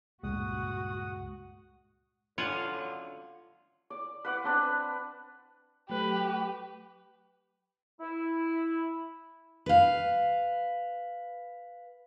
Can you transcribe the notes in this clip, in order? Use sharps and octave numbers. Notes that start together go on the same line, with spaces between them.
C#2 G2 A#2 G#3 F#4 F#5 D#6
F#2 A2 D3 F4 C#5 F#5 G#5
D5
B4 F#5 D6
C4 D4 B4
F#3 A3 G4 B4 F#6
E4
B4 F5